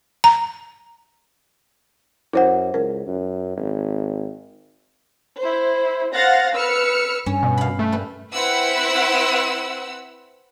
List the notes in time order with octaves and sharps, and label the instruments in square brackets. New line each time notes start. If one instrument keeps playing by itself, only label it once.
[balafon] A#5
[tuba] F#2 [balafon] E4 C5 F#5
[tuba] C#2 [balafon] A#4
[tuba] F#2
G#1
[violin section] E4 C5
C5 F5 F#5 A6 A#6
B4 E6 F6 C#7
[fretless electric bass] G2 [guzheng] C#4
[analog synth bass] B2
[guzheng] F5 B5
[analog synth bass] A3
[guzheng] G3 B4
[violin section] C4 E4 B4 F#5 E6